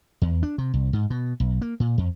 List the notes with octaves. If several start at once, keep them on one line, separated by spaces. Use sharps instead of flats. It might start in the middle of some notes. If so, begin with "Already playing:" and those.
E2
D4
C3
C2
G#2
B2
B1
A#3
A#2
F2